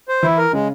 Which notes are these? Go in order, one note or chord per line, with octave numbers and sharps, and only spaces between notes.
C5
E3 E4
A#4
C#3 G#3